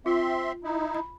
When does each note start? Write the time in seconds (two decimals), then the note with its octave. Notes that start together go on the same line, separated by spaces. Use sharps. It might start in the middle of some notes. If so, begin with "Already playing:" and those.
0.06 C4 F4 E5 C6
0.64 D#4 E4
0.95 B5